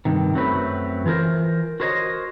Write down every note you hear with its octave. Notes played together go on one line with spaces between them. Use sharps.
G2 C3 D#3
F#2 F#3 A3 C4 B4
E3 F4 G#4 A#4 C5
F#4 A#4 C5 C#5 D#5